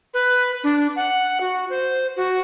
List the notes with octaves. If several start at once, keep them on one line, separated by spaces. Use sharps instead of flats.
B4
D4
F#5
F#4
C5
F#4